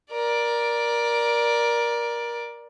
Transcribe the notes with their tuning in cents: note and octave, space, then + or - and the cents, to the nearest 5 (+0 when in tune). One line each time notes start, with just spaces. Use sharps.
A#4 +20 D5 +0